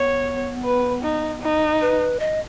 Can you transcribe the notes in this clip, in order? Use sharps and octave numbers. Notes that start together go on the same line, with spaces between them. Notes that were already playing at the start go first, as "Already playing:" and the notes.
Already playing: B3 C#5
B4
D#4
D#4
B4
D#5